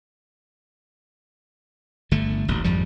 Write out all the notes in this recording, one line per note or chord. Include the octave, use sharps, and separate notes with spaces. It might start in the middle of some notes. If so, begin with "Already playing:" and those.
G1 D3 A3
D#1 A1
G#1 F2 F3 G3